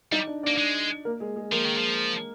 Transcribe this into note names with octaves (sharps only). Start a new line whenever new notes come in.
G3 D#4 D#5
D4 D5
A#3 D4 D5
G#3
A#3 A#4
G#3 G#4
G#3 G#4
F3 A#3 A#4
D#3
F3